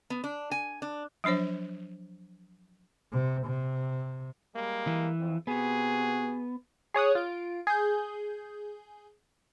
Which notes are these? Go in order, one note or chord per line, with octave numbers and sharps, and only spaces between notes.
B3
D4
G#5
D4
F3 F#3 D4 C5 C#5
C3
C3
G3 G#3 A#3
E3
F2
C3 B3 F#4 G#4
G#4 C#5 D#6 F#6
F4 D7
G#4 G6